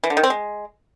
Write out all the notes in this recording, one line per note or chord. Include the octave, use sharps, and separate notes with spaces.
E3
D3
D#3
C4
G#3